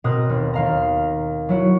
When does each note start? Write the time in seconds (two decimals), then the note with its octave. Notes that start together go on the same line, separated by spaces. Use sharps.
0.04 B2 C4 A#4 D#5 D#6 F#6
0.29 D#2
0.54 D#2 F5 A#5
1.49 F#3 E4 F#4